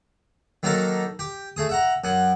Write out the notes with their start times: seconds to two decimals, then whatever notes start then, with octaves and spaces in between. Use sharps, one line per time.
0.63 D#3 F#3 A#3 D#4 A4 A#4
1.19 G4
1.57 A3 G#4 D#6
1.69 E5 F#5 A#5
2.04 F#2 F#5 G#5